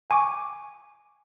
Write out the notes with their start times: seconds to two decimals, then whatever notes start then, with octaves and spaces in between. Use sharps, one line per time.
0.10 G5 G#5 C#6 D6